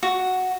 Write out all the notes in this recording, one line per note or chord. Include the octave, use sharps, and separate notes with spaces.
F#4